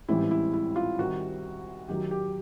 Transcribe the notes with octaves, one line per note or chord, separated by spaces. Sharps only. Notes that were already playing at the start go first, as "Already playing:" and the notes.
A1 G#2 E3 G3 C4 E4
E4
E4
F4
C2 C3 D#3 F#4
F#2 D#3 F#3 G4
G4